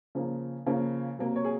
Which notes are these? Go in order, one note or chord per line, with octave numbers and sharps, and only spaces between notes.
C#3 F3 A#3
C#3 F3 A#3
C3 F#3 A#3
C#5
G#4